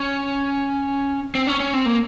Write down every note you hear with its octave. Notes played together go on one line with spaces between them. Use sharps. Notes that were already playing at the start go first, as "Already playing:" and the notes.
Already playing: C#4
C4
C#4
C#4
C4
A#3